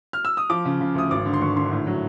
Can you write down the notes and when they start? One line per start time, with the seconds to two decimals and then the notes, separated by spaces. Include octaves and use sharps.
0.13 F6
0.25 E6
0.37 D#6
0.50 F3 D6
0.65 C#3
0.81 C#3
0.95 D2 D#6
1.11 G#1 D6
1.26 D3
1.34 C6
1.41 G#1 C#6
1.57 D3 C6
1.71 A2
1.87 F#3